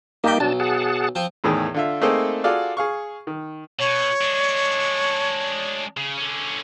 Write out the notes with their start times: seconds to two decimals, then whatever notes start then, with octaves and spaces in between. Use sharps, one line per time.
0.24 G2 A#3 D#4 G4 G5
0.40 B1 D4 A5
0.60 G#4 F#5 A5
1.15 F3 C4
1.44 E2 A2 D#3 G#4
1.74 D3 F4 E5
2.01 A3 A#3 C4 D#4 G#4 A4
2.44 F4 F#4 G#4 A4 D5 F5
2.77 G#4 F5 C#6
3.27 D#3
3.79 B2 C#5
4.21 G#3 D4
5.97 C#3
6.18 D3 C#4